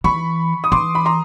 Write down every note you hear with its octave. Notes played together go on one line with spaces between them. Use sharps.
E3 B5 C#6
D#6
E3 C6 D6
B5
A#5 C6